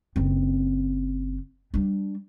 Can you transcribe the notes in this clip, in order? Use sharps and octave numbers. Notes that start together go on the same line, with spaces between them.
F#1 C4
G3 D4